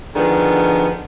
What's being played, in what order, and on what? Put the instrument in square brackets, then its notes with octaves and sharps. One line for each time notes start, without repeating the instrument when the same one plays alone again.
[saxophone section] D3 D#3 F3 G#3 B3 D4